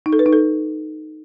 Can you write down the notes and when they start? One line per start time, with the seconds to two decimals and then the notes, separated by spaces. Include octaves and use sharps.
0.06 D#4
0.13 A4
0.19 B4
0.26 D#4
0.33 A4